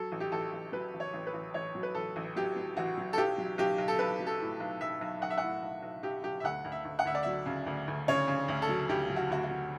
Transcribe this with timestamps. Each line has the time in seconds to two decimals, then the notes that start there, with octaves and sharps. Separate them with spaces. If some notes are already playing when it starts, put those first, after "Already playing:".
Already playing: F#3 A4
0.12 A1
0.20 G4
0.32 A1 A4
0.53 A1
0.72 F#3 B4
0.94 A1
1.00 C#5
1.13 A1
1.27 B4
1.33 A1
1.54 A1 C#5
1.75 F#3
1.83 B4
1.95 A1 A4
2.16 A1
2.36 F#3 G4
2.56 F#3
2.77 A1 F#4
2.97 F#3
3.13 A4
3.18 B1 G4
3.38 F#3
3.58 B1 G4
3.78 B1
3.88 A4
3.99 B1 B4
4.20 F#3
4.27 A4
4.40 A2
4.60 B1
4.81 B1 E5
5.01 B1
5.21 B1 F#5
5.30 E5
5.38 F#5
5.43 A2
5.62 B1
5.82 B1
6.03 B1 G4
6.23 B1 G4
6.40 E5
6.44 D2 F#5
6.65 D2
6.72 E5
6.85 D2
6.99 F#5
7.05 D2 E5
7.15 D5
7.23 F#3 E5
7.46 C#3
7.66 D2
7.87 D2
8.08 C#3 C#5
8.28 C#3
8.48 D2
8.62 A4
8.69 F#3
8.89 D2 G4
9.09 F#3
9.16 F#4
9.30 D2 F#4
9.44 F#4
9.51 F#3